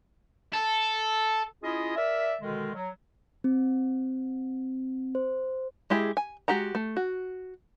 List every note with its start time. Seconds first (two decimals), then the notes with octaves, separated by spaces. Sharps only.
0.53 A4
1.63 C#4 E4 F4 G#4 D#5
1.95 A#4 D5 E5
2.41 B2 D3 D#3 G#3
2.74 F#3
3.44 C4
5.15 C5
5.90 G#3 E4 G4 G#4
6.17 G#5
6.48 G#3 F#4 G4 F#5 A#5
6.75 A3
6.97 F#4